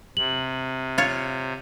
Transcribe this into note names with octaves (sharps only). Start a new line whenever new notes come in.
C3 F#7
F4 C#5